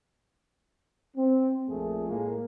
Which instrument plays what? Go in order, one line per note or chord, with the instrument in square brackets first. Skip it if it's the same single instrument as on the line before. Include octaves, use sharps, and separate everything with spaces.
[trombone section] C4
A#1 F2 A#2 A3 G#4
A2 G#3 A#3